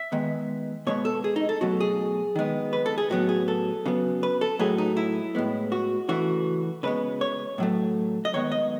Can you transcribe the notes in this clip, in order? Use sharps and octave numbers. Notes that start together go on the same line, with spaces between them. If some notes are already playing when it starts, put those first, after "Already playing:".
Already playing: E5
D#3 G#3 B3
B2 G#3 B3 C#5
A4
G#4
D#4
A4
B2 F#3 A3 F#4
G#4
D#3 G#3 B3
B4
A4
G#4
A2 F#3 B3 F#4
G#4
A4
C#3 F#3 B3
B4
A4
A2 F#3 A3 G#4
D#4
E4
A2 G#3 B3
F#4
C#3 E3 A3 F#4
C#3 G#3 B3 B4
C#5
A2 F#3 A3
D#5
D#3 G#3 B3 C#5
D#5